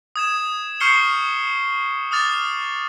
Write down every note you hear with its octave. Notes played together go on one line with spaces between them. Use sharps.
D#6 G#6 E7
C#6 F6 G6 C7 C#7 G7
D6 D#6 F6 A6 F7